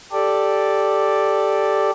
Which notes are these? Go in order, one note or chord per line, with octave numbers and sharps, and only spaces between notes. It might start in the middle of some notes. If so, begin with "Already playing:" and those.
G4 A4 D5